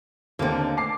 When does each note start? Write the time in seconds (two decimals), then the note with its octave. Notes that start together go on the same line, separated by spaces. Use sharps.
0.39 D#2 D3 A#3 C4
0.77 A5 D6 C7